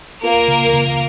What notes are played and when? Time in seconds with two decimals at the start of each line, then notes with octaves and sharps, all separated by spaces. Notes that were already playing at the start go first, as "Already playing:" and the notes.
0.23 A#3 F4 A#4
0.48 C#3
0.73 C#3